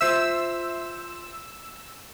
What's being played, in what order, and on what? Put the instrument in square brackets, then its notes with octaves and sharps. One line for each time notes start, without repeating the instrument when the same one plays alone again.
[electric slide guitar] F4 C5 E5 [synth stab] E6